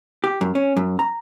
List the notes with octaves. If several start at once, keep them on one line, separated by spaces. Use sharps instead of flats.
G4
F#2
C#4
F#2
A#5